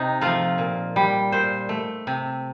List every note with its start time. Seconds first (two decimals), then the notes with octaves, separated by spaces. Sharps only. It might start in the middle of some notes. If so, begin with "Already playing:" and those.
Already playing: C3 D#4
0.21 F3 A3 F4
0.58 A#2
0.96 G3
1.32 A#2 C5
1.69 A3
2.07 C3